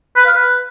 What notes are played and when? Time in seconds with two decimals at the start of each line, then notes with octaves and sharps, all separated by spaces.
0.16 B4
0.26 F5
0.35 B4